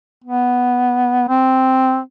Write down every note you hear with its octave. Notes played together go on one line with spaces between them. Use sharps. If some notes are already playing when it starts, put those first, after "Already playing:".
B3
C4